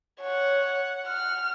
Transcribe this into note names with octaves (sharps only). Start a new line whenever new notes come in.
C#5 F#5
F6